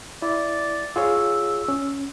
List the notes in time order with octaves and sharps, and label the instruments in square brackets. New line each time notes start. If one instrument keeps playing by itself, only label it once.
[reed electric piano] E4 [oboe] D5
[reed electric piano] F4 G#4 C#5 [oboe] E6
[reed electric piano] C#4